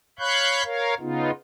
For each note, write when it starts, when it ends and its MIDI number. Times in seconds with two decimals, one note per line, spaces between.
0.19 0.64 73
0.19 0.64 77
0.19 0.64 83
0.19 0.64 85
0.19 0.64 90
0.19 0.64 91
0.64 0.94 70
0.64 0.94 73
0.64 0.94 77
1.00 1.31 49
1.00 1.31 59
1.00 1.31 63
1.00 1.31 65